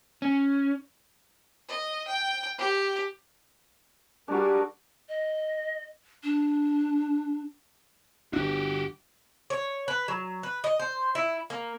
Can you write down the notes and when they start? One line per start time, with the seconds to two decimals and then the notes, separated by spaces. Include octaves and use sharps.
0.22 C#4
1.69 D#5
2.07 G5
2.58 G4
4.28 G3 D4 F#4 G#4 A#4
5.09 D#5
6.23 D4
8.33 G1 D4 F#4 G4
9.50 C#5
9.88 B4
10.08 F#3
10.43 B4
10.64 D#5
10.79 C5
11.15 E4
11.50 A#3